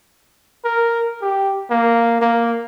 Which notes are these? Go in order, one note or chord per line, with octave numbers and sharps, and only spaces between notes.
A#4
G4
A#3
A#3